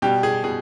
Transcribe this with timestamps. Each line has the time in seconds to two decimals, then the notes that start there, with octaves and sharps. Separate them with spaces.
0.02 B2 G3 G4
0.23 G#4
0.44 B2 G#4